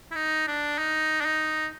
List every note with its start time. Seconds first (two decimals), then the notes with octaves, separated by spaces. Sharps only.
0.11 E4
0.16 D#4
0.47 D4
0.78 D#4
1.21 D4
1.25 D#4